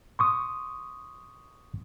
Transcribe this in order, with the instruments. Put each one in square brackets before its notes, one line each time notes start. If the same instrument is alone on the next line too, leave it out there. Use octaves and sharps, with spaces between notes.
[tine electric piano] C6 C#6 D#6